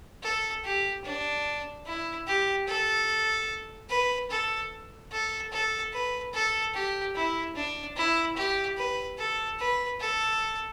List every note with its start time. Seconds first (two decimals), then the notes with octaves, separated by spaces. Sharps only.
0.23 A4
0.64 G4
1.04 D4
1.86 E4
2.27 G4
2.67 A4
3.90 B4
4.30 A4
5.12 A4
5.52 A4
5.93 B4
6.33 A4
6.74 G4
7.15 E4
7.55 D4
7.96 E4
8.37 G4
8.77 B4
9.18 A4
9.59 B4
10.00 A4